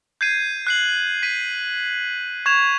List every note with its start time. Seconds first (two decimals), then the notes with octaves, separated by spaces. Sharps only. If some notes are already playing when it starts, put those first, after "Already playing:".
0.21 G6 G#6 C7 D#7
0.67 F#6 C7 F#7
1.23 B6 D#7
2.46 C#6 G#6 E7 F7